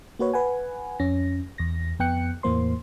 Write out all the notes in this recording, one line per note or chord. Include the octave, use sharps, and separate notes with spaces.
A#3 F#4 B4 C#5
B4 F#5 G#5
F2 C#4 A#6
E2 A#6
F2 B3 G5 F#6 C#7
E2 A2 E3 A#3 C5 C6